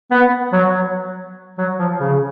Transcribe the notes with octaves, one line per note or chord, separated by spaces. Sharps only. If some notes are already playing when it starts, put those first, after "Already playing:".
B3
F#3
F#3
F3
C#3